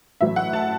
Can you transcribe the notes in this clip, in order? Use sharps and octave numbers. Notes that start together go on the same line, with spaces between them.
A1 A2 F#3 E5
F#5
A5